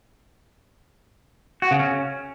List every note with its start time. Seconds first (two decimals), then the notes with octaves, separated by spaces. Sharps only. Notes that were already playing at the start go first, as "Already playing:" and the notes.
1.62 F#4
1.71 C#3
1.80 C#4